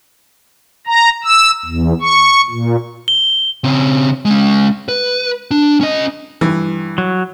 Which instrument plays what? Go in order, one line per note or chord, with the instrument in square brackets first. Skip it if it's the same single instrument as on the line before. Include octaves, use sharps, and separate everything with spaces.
[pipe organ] A#5
E6
E2
C#6
A#2
[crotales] G7
[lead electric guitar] C#3 C4
G#3 C#4
B4
D4
C#4 D#5
[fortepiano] G2 E3
[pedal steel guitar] F#3